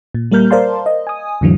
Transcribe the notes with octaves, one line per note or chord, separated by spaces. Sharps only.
A#2
G3 A#3 A#4 F6 G6
A#4 C5 D5 F5 A5 C6
D#5
G#5 D#6
F2 A2 D3 E3 F#3